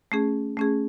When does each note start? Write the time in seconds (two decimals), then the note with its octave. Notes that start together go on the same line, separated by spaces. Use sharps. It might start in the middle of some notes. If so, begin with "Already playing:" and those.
0.12 A3 C#4 G#4
0.57 A3 C#4 G#4